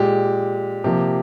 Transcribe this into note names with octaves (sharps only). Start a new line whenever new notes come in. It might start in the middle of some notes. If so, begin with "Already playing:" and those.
Already playing: A#2 G#3 G4
C3 F3 A#3 G4